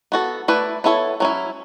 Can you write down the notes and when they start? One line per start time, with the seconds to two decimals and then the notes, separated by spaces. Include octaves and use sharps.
0.12 B3 F#4 A4
0.48 A3 E4 B4 D5
0.84 B3 E4 A4 C#5
1.20 F#3 C#4 E4